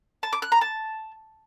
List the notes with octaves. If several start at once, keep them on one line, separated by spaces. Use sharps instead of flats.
A5
D6
F#6
A#5
A5